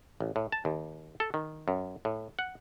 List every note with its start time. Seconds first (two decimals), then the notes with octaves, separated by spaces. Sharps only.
0.21 A1
0.36 A2
0.52 A5
0.65 D#2
1.20 A4
1.34 D#3
1.68 F#2
2.05 A2
2.39 F#5